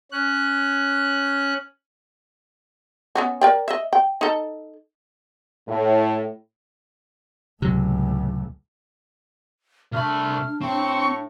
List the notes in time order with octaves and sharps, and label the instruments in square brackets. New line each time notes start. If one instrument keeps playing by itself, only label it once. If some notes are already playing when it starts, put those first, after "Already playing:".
[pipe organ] C#4 F#6
[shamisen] B3 C#4 F#4
A#4 D5 G5
D#5 E5
G5
D#4 A4
[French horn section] A2
[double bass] C#2 A2 [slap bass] C3 F#3
[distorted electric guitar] C2 B5 [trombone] A3 [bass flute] D4 [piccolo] F6
[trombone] A2 [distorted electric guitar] C4 [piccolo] C#6